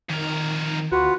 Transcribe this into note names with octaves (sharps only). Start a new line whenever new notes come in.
F2 D#3 A#4
D2 F4 F#4 B4 F#5